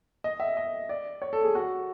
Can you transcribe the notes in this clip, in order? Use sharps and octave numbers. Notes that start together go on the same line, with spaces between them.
D#5
E5
D#5
D5
C#5
A4
G#4
F#4